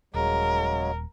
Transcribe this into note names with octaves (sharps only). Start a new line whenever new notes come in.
D#1 C#3 F#3 G#3 A#4